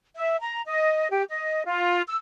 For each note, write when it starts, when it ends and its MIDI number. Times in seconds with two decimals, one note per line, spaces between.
0.16 0.37 76
0.40 0.61 82
0.66 1.08 75
1.11 1.23 67
1.30 1.63 75
1.65 2.02 65
2.07 2.16 88